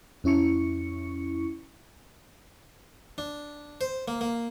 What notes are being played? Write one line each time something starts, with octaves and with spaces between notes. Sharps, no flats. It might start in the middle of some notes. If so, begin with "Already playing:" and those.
F2 C#4 E4 C#6 C#7
D4
C5
A#3
A#3